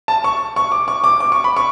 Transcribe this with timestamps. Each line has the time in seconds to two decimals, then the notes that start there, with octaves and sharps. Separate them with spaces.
0.08 A5
0.24 C#6
0.56 C#6
0.72 D6
0.88 C#6
1.04 D6
1.20 D6
1.32 C#6
1.44 B5
1.57 C#6